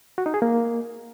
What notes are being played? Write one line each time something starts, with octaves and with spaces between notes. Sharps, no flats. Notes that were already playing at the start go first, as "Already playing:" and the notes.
F#4
D#4
G#4
A#3